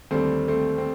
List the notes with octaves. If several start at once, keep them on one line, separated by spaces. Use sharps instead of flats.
D#2 D3 G3 A3 C4
A3 C4
C4